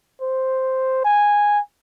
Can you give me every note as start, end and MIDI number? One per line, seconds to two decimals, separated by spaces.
0.22 1.00 72
1.05 1.59 80